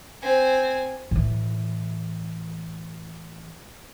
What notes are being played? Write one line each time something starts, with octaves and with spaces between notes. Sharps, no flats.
C4 G#5
A2 E3